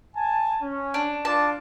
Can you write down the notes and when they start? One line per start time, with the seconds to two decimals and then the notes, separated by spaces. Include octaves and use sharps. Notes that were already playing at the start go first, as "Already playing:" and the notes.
0.15 G#5 A5
0.62 C#4
0.94 D4
1.25 D4 F4 A5 D6